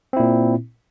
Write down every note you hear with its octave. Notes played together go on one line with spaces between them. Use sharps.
A#2 C4 E4